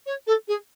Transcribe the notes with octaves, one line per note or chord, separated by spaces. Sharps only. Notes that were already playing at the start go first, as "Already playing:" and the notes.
C#5
A4
G#4